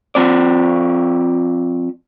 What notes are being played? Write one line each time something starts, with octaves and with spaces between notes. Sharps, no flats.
F3 C4 D5